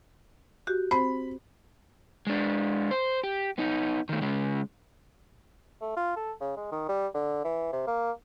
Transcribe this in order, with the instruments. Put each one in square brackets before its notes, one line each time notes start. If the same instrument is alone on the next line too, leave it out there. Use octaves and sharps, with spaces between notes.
[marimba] F#4 G4
[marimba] C4 C5 [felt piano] B5
[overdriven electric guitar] G#3 D4
C5
G4
B3 D#4
D#3 A3
C#3 G#3
[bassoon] A3
F4
A4
C#3
G#3
D#3
G3
D3
E3
C3
A#3